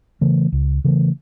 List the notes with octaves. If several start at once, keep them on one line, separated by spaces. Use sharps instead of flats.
C#3 E3 A3
C#2
C#3 E3 A3